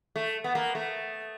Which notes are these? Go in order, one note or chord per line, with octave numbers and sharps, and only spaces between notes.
A3
B3
A#3
A3